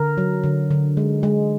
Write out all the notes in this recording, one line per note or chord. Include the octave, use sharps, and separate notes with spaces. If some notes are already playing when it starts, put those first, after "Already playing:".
Already playing: D3 A#4
F#3
D3
D3
G#3
G#3